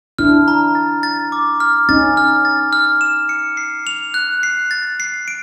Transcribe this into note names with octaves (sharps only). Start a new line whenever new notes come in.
D4 E4 F6
A#5
A6
A6
D6
F6
C#4 D#4 A6
F6
A6
F6
E7
C#7
C7
F7
F#6
C7
A6
C7
D7